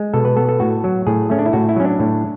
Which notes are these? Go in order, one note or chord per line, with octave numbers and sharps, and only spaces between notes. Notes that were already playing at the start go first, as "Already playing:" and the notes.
Already playing: G#3
B2 A4
B4
B3 A4
A4
A2 F#4
F#3
A2 G#4
A3 C#4
D4
E4
A2 F#4
E4
F#3 C#4
D4
A2